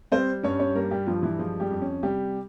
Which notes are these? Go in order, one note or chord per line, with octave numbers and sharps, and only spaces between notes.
G3 C4 C5
G2 C#4 C#5
C#4 C#5
G3 A#3 A#4
G3 G4
G2 F3 F4
E3 E4
F3 G#3 F4
G3 G4
F2
C#4
C3 G3 G4